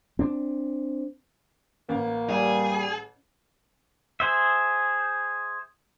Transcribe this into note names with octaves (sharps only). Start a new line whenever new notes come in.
C4 D4
A1 A#3
G3 G#4
G#4 C5 E5